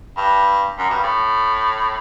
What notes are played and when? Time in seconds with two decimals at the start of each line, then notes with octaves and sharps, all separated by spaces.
0.18 G2
0.79 F#2
0.90 G2
1.03 A2